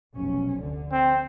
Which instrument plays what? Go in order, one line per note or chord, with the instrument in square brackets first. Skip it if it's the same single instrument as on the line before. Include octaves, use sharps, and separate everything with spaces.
[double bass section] F1 B1 C#4
D2 D3
[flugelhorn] C4